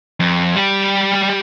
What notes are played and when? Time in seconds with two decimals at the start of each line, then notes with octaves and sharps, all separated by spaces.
0.20 F2
0.56 G3 G4